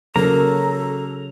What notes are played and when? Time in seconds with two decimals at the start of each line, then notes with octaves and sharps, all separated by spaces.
0.16 C#3 F#3 A#3 A4 A#5